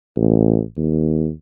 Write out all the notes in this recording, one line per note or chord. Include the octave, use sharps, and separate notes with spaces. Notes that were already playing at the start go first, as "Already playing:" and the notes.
A1
D#2